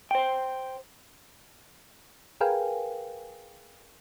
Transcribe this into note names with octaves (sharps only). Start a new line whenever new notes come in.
C5 G5
G#4 A#4 B4 F5 G5 G#5